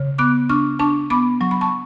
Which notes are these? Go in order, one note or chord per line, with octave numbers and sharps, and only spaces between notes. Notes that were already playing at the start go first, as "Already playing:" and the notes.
Already playing: C#3
B3 D6 F#6
D4 C#6 F6
D4 A5 C#6
B3 B5 D6
F#3 C#6
B5
A5 C#6